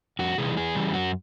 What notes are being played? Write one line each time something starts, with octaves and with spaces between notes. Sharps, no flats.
F2 F#4
C3 E3 G3 G#4
E2 G#4
C#3 E3 G3
F#2 F#4